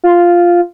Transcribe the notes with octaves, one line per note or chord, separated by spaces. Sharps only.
F4